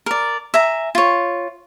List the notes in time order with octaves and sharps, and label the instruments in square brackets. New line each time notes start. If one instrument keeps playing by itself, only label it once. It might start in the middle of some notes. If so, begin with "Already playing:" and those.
[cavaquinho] A#4 D5
E5 G#5 A#5
F4 C#5